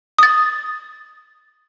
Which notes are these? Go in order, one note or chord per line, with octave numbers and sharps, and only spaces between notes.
D#6 A6